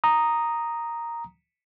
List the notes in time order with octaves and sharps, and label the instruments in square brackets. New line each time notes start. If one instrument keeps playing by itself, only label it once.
[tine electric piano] A#5 D#6